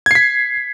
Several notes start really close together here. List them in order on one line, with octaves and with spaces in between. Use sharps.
G#6 C7 B6